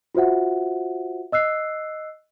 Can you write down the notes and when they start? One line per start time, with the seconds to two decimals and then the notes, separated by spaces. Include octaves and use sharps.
0.15 F4 F#4 C5 E5 F#5
1.32 D#5 E6 F#6 C7